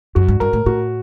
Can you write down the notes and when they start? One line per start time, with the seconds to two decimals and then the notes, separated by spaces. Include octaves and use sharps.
0.15 F#2 F#4
0.28 G2
0.40 G2 A#4
0.53 A2
0.66 A2 F#4